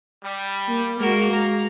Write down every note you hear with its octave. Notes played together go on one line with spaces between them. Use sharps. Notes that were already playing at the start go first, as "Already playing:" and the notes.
G3
A#3
G#3 A#3 F#4 A#4
G#3 A#5